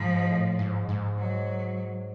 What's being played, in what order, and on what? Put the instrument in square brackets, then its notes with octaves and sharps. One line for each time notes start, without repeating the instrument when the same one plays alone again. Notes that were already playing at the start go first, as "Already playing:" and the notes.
Already playing: [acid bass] G#2 [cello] F3
[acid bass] A2
G#2
G#2
[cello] F#3